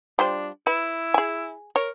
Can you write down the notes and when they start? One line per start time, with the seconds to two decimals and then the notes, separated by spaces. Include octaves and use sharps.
0.19 G3 D4 F4 C5
0.67 E4 B4
1.14 G#4 G#5
1.76 A#4 C#5